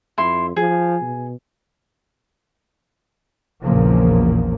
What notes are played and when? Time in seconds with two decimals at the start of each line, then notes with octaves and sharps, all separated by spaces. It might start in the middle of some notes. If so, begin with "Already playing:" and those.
0.18 F2 E4 C6
0.56 F3 G#4
1.02 B2
3.63 A#1 E2 A#2 C#3 F3 A#3